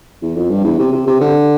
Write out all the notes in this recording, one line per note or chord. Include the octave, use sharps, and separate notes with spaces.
E2
F2
G2
E2
C3
C3
C3
D3